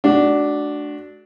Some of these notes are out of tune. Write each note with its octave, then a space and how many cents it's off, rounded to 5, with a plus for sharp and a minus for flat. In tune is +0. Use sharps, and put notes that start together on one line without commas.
A3 -45 D4 +0 F#4 +15